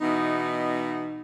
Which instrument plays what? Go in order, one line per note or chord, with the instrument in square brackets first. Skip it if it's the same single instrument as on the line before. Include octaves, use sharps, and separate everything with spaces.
[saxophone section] B2 E3 B3 D#4